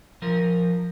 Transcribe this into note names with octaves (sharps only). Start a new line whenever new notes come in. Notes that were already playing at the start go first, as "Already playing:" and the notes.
F3 A#4